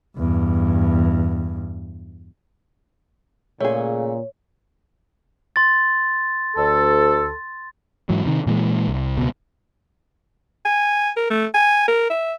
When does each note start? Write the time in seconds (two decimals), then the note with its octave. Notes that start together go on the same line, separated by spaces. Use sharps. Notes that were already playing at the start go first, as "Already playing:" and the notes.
0.18 E2 G2
3.60 A#2 C#3 A3 G#4 C#5
5.56 C6 A6
6.57 D2 A4
8.09 G#2 E3 F#3
8.26 C3 D#3
8.47 A#2 E3 F#3 G#3
8.88 C2
9.18 C#2 B2
10.65 G#5
11.16 A#4
11.30 A3
11.54 G#5
11.88 A#4
12.10 E5